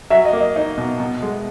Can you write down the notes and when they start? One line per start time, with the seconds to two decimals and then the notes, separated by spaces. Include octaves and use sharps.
0.10 F#3 E5
0.25 D#5
0.33 A#3
0.40 D#5
0.56 D#4 D#5
0.78 B2
1.00 B2
1.23 G#3